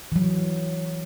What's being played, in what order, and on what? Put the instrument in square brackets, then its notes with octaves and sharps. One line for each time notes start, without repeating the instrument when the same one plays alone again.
[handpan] E3 F#3